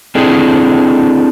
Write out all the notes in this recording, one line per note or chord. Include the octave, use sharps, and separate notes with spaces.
C4 D4 E4 G#4 A4